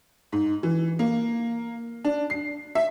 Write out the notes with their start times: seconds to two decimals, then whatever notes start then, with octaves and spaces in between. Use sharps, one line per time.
0.32 G#2
0.63 E3
0.99 A#3
2.05 D4
2.30 C7
2.75 E5